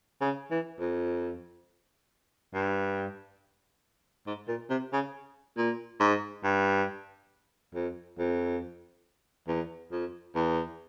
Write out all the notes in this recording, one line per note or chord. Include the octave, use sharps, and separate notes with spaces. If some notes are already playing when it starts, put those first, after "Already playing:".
C#3
E3
F2
G2
G#2
A#2
C3
C#3
A#2
G#2
G2
F2
F2
E2
F2
E2